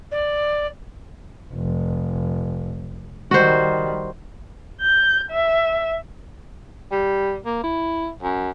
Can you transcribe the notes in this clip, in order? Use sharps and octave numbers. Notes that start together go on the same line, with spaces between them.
D5
F1
D#3 G3 F#4 C5
G6
E5
G3
A#3
E4
F#2